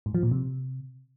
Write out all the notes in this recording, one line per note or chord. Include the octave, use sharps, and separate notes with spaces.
G#2
F3
A#2
C3